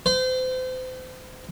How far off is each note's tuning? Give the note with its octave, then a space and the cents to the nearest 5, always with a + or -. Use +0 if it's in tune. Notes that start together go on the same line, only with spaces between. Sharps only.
C5 -35